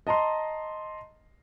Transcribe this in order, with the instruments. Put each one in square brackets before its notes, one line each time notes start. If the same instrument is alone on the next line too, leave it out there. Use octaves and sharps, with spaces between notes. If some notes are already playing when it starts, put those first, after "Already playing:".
[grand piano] D#5 A5 A#5 C6